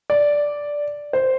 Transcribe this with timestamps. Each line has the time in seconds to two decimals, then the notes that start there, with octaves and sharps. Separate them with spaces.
0.10 D5
1.13 C5